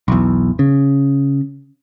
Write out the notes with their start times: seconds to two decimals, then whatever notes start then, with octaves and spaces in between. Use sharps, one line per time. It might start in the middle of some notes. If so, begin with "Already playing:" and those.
0.08 B1 E2
0.59 C#3